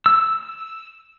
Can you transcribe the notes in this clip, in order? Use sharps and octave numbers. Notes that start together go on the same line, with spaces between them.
E6